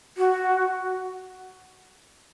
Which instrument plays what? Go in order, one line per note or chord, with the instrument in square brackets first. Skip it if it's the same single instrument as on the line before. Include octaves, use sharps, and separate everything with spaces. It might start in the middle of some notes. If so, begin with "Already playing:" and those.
[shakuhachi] F#4